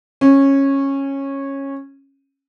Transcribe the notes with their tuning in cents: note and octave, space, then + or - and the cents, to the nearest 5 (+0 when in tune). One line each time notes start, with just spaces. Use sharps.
C#4 -15